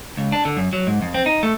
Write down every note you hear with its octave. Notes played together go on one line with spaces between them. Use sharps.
C#2
D4
D3
F#2
F#3
G#2
F2
C4
D#4
A3